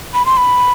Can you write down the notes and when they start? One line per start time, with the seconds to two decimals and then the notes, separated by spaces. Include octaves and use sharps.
0.14 B5
0.26 C6
0.37 B5